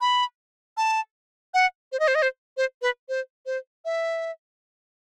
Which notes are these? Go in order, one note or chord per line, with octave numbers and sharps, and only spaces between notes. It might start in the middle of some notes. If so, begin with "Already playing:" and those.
B5
A5
F#5
C5
D#5
C5
D#5
C5
C5
B4
C5
C5
E5